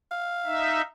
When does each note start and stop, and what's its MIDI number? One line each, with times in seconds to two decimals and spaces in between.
0.11 0.83 77
0.46 0.82 63
0.46 0.82 76